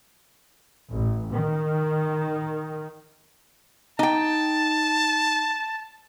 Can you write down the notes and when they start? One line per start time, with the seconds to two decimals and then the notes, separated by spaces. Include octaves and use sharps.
0.92 A1
1.33 D#3
3.99 D#4 G5 A5